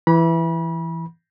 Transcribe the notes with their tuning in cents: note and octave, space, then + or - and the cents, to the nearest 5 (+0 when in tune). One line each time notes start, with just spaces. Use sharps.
E3 +10 B5 -30